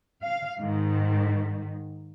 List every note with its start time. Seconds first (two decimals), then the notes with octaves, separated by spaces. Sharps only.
0.23 F5
0.59 G#2 D#3